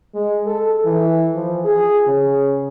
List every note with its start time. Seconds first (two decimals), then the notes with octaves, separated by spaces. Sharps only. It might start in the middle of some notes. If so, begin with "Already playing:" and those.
0.15 G#3
0.46 A4
0.85 E3
1.35 F3
1.65 G#4
2.08 C#3